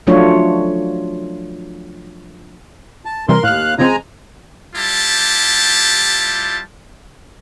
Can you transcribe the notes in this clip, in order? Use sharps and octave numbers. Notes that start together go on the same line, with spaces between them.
F3 F#3 A3 D4 F4 C#5
A5
C3 E3 G3 A#4 C6
D#2 A2 F5 F6 F#6
C#3 F3 G#3 C4 G#5 A#5
G3 E4 F4 G4 A5